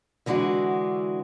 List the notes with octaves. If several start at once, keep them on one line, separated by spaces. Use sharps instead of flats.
D3 E3 G#3 D4 F#4